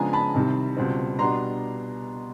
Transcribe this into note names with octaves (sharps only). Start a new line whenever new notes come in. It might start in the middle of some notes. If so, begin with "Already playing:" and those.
Already playing: C#3 F3 G#3 B3 D4 G#5 A#5
A5 B5
C2 C3 D#3 G3
C#2 B2 G3 C4
B2 G3 B3 D4 A#5 C6